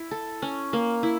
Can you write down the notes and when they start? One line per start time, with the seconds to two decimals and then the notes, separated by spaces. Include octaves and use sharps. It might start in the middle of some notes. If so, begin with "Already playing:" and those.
Already playing: E4
0.11 A4
0.42 C#4
0.73 A#3
1.03 E4